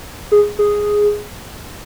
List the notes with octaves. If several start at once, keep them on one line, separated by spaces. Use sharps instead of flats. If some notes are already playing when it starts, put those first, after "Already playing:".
G#4
G#4